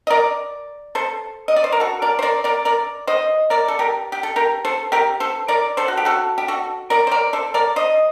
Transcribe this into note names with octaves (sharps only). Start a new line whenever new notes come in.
D#5
A#4 D5
A4 C5
D#5
D5
C5
A#4
F#4 A4
A#4 D5
C5
A#4 D5
A#4 D5
A#4 D5
C5 D#5
A#4 D5
A4
G4 A#4
G4
A4
G4 A#4
A4 C5
G4 A#4
A4 C5
A#4 D5
A4 C5
F#4
G4
F#4 A4
G4
F#4 A4
A#4 D5
C5
A#4 D5
A4 C5
A#4 D5
C5 D#5